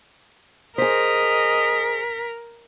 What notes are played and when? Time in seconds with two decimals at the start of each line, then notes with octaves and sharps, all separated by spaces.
0.78 G#4 A#4 C5 D#5 B6